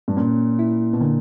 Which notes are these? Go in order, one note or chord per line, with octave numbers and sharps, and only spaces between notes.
G2
A#2 C#4
E4
B2
A#2 D3